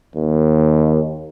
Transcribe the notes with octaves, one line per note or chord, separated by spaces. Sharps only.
D#2